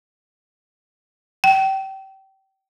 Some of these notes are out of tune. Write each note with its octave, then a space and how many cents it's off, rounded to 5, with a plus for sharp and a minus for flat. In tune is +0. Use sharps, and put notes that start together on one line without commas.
G5 -30